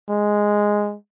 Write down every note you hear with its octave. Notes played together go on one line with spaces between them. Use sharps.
G#3